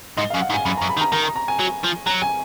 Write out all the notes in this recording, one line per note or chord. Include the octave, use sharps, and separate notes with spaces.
G#2 D#5
F5
F#2
F#5
G#2
G#5
F#2 B5
A#5
F#2
B5
D#3
A#5
D#3 A#5
A#5
A#5
G#5
F#3
F3
F#3 A#5
G#5